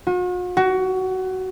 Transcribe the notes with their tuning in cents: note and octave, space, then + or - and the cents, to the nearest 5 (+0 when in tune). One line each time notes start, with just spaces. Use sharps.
F#4 -45
F#4 +20